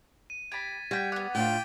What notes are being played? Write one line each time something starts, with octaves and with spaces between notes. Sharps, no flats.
D#7
G4 B5 G#6 A6 B6
G3 F#4 G5 G#6 B6
B3 F#5 D6
A2 D4 F4 G5